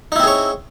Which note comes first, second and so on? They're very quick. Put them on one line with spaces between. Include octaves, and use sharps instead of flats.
D#4 E4 C4 G#4 C#5